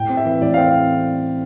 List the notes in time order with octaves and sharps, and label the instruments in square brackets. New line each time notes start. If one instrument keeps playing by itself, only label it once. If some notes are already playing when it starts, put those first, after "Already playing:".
Already playing: [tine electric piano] A2 [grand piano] G5
[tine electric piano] C4
[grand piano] E5
[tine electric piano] E3
[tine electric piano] A2 [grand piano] D5
[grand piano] F5
[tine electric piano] C4